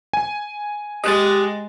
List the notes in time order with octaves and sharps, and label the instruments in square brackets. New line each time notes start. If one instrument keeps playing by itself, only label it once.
[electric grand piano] G#5
[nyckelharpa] G#3 [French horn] G4 [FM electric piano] D#5 F#6 A6